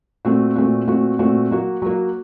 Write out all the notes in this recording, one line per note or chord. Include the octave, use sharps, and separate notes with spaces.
A#2 A3 C4 F#4
A#2 A3 C4 F#4
A#2 A3 C4 F#4
A#2 A3 C4 F#4
F#3 A#3 F#4
F#3 A#3 F#4